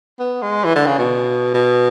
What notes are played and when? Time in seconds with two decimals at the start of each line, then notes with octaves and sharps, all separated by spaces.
0.20 B3
0.42 G#3
0.64 E3
0.75 D3
0.86 C#3
0.98 B2
1.54 B2